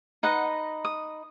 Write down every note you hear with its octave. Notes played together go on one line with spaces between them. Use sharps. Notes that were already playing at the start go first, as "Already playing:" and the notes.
D#4 B4 D#5 F#5
D#6